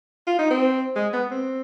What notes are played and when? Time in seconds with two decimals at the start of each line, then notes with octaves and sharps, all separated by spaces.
0.27 F4
0.39 D#4
0.50 C4
0.96 G#3
1.13 B3
1.31 C4